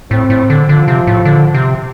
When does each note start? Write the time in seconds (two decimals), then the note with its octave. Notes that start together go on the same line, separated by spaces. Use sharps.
0.11 A2 C4
0.30 A2
0.50 D3
0.69 D3 F3
0.88 C3
1.07 A2
1.25 D3
1.54 C3